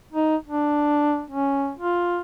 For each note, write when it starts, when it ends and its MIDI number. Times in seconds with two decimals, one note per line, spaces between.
0.12 0.36 63
0.47 1.24 62
1.30 1.72 61
1.79 2.21 65